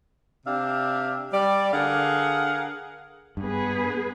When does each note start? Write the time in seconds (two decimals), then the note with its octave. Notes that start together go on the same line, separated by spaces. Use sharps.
0.46 C3 D4 G4 E5 F5
1.32 G3 D5
1.73 D3 G#4 A#4 F5 F#5
3.37 G2 B3 G#4 B4